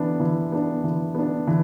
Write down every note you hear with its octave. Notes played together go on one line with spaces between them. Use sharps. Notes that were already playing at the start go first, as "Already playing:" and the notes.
Already playing: E3 B3 D4
E3
B3 D4
E3
B3 D4
E3